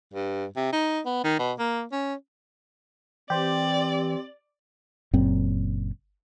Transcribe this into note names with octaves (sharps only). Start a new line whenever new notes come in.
G2
C3
D#4
B3
D#3
B2
A#3
C#4
E3 C4 G4 C5 D5
F#1 F#2 A#2 C4